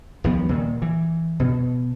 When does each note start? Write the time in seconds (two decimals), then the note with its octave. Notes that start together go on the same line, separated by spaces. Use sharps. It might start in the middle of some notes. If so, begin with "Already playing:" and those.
0.24 D#2 F3 G3 B3
0.49 A#2 D#3
0.82 E3
1.40 B2